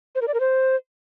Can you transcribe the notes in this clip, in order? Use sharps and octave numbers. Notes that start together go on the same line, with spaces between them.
C5
A#4
D5
A#4
C5